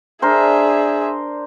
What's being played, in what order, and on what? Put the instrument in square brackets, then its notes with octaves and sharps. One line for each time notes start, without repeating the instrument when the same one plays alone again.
[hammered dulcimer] D4 A#4 C5 [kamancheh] G#4 E5